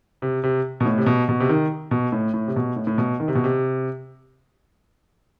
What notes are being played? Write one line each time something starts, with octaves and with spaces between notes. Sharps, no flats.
C3
C3
B2
A2
C3
B2
B2
C3
D#3
B2
A2
A2
C3
B2
A2
A2
B2
D#3
C3
B2
C3